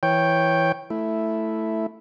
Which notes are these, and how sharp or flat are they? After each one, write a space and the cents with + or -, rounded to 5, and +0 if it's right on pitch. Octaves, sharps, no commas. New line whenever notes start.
E3 +0 C#5 -10 G5 +0
A3 +0 E4 +0